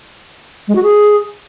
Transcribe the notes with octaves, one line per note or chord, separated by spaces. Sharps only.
G#3
F#4
G#4